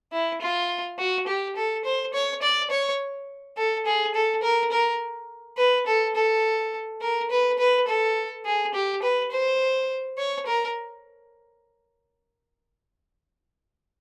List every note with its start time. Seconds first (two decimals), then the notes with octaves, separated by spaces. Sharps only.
0.12 E4
0.41 F4
0.98 F#4
1.27 G4
1.56 A4
1.85 C5
2.14 C#5
2.42 D5
2.70 C#5
3.57 A4
3.86 G#4
4.14 A4
4.43 A#4
4.72 A#4
5.58 B4
5.87 A4
6.15 A4
7.01 A#4
7.31 B4
7.59 B4
7.88 A4
8.45 G#4
8.74 G4
9.03 B4
9.32 C5
10.18 C#5
10.46 A#4